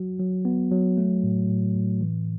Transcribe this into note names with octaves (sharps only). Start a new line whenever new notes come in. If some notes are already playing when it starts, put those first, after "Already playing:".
Already playing: F#3 F#4
F#3
B3
F#3
A3
A2
A2
A2
E3